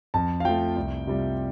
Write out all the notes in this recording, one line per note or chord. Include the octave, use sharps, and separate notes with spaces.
F2 A5
F5
F3 A3 F4 G5
C2
C3 G3 F4